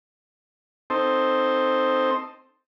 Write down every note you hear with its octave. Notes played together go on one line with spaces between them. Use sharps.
C4 D#4 A4 C5